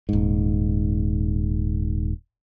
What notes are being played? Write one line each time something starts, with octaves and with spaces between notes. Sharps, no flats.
D#1 G#2